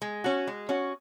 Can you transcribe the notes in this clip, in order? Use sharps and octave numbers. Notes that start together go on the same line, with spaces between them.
G#3
C#4 F#4
G#3
C#4 F#4